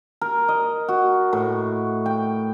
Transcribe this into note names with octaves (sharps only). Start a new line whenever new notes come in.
A#4
D#5
F#4
A2
G5